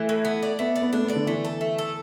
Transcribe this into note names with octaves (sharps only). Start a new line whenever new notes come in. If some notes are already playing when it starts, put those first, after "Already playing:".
Already playing: E3 A3
A2
B3
D5
A3 B3
D5
B3
A3 D4
B3
D5
D3
E3 A3
A4
A3
A4